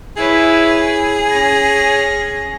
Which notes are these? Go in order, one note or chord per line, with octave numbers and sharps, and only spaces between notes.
E4 G#4 B4 C#5
C#4 A#6